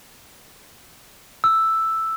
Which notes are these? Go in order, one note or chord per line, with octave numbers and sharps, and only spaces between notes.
E6